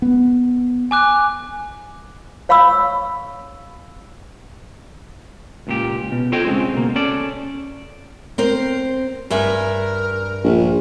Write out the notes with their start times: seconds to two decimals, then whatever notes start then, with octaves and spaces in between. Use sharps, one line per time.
0.02 B3
0.91 G#5 D6 F#6
2.49 C#5 F5 B5 C#6 E6
5.67 C#2 A#2 G4
6.12 B2
6.32 F4 A4 C5 C#5 D#5 G5
6.45 C#3 G#3 C4
6.74 B2 A#3
6.96 C#4 A4 D5
8.38 C4 A#4 C5
9.30 G2 G#4 A#4 E5
10.44 A#1